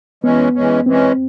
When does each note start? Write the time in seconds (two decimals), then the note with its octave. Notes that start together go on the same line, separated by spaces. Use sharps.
0.24 E3 G#3 B3 C#4
0.55 E3 G#3 C#4
0.86 E3 G#3 C4 C#4